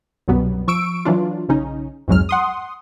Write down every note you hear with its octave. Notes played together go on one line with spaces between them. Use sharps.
C2 F#2 B2 F#3 G3 B3
F3 C#6 E6 D7
E3 F#3 D4 F4
B1 C#3 C#4 D#4
C2 F2 G#2 F#3 G#3 F6
F#5 C6 D#6